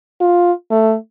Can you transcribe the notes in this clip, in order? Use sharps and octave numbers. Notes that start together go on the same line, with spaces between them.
F4
A3